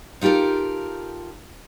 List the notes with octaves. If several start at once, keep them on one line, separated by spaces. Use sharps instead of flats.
D#4 F4 G4 A4 A#4